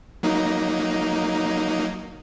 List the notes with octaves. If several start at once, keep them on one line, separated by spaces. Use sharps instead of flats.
F#3 A#3 D#4